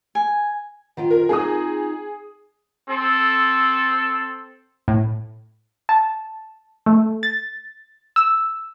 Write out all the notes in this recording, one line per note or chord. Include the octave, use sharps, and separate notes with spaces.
G#5
D#3 F4 G5
A#4
C4 D#4 F4 G#4 D#6
C4 A4
A2
A5
A3
A6
E6